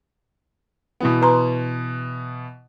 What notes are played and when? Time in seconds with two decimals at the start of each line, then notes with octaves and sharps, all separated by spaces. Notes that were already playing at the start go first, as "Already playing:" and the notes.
1.00 B2 E3 B3
1.22 B4 A#5 C6